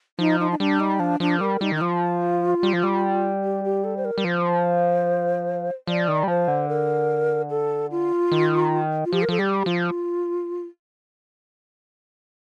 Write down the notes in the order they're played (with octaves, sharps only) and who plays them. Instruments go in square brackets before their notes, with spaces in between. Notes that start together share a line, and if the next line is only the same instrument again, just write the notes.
[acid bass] F3 [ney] D#4
[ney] D#4
D#4
[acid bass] G3 [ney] D4
[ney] D#4
[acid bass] F3 [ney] D4
[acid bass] F3 [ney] D4
[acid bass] G3 [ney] A#4
[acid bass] G3 [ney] D#4
[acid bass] D#3 [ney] D#4
[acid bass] F3 [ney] F4
[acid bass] G3
F3
G3
[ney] G4
G4
A4
C5
A#4
[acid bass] G3
[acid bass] F3 [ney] C5
[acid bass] F3 [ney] D5
[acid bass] D#3
G3
[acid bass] F3 [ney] C5
[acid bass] D3
[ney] A#4
A4
F4
[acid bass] D#3
[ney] F4
[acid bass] F3 [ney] G4
[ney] A#4
[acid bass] F3 [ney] A4
[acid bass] G3 [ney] G4
[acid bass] F3 [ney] F4